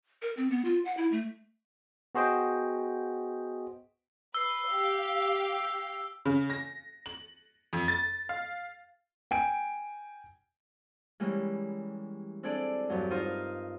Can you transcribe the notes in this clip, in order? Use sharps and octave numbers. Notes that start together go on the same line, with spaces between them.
A#4
C4
B3
F4
F#5
E4
A3
B3 F#4 G#4 C5 D#5 G5
B4 E6 C7
G4 F5
C#3
A#6
F#7
F2
A6
F5
G5 G#5 D7
E3 G3 G#3 A#3 C#4
C4 D4 E4 G#4 A4 D5
E2 G2 F#3
D#4 F4 A#4 C5 D#5 F5